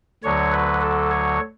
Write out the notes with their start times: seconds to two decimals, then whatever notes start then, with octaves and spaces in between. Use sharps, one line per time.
0.23 D2 D3 F#3 C#5
0.52 B4
0.81 A4
1.10 C#5